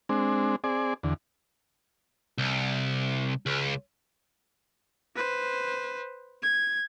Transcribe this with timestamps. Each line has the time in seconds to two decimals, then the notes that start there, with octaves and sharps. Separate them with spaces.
0.09 G#3 C4 D4
0.64 C4 G#4 D5
1.03 E2 D3
2.38 C2
3.46 C#2
5.16 B4 C5
6.42 G#6